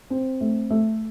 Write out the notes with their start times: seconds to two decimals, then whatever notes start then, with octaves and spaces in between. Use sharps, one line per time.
0.10 C4
0.41 A3
0.70 A3